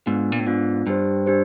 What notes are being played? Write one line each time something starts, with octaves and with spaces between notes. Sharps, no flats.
G#2 B3 D4 F4
A#2
A2
G#2 B3 D4 F4
G2 D4 G4 C5
D4 G4 C5